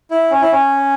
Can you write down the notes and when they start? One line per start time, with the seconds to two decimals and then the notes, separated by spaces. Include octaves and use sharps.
0.11 E4
0.31 C#4
0.41 E4
0.52 C#4